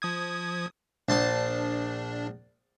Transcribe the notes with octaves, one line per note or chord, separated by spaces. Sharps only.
F3 D#6 G#6
A#1 D4 A5 C6